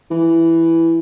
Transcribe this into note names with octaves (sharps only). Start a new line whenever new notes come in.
E3